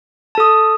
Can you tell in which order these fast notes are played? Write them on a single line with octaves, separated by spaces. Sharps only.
A5 A4 D#6